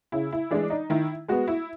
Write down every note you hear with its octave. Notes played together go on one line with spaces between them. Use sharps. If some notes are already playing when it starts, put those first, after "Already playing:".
C#3 E4
E4
E3 G#3 D4
D#4
D#3 E4
G#3 B3 F#4
E4